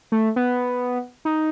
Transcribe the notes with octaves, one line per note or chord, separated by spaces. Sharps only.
A3
B3
D#4